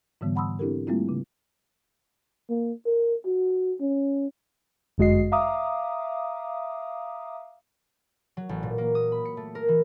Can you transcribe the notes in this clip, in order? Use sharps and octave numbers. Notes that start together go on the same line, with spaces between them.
G#2 D3 E3 G3 B3
F#5 A5 B5 C6 D#6 E6
C4 D4 E4 G4 A4 A#4
G3 A3 A#3 C4 E4 F4
C#3
A#3
A#4
F#4
C#4
G1 F#2 G#3 F#4 D#5 C7
E5 F5 A#5 D6 D#6
F#3
A1
A#2
A#3
D#6
B5
C#7
A3
A#4
E3